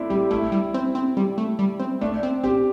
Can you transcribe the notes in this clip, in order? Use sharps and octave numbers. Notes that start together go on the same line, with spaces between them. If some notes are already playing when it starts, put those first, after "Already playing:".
Already playing: A3 C4 D4 E4
G3 G4
A3 E4
G3
C4
C4
G3
A3
G3
C4
A3 D4
C4
C4 G4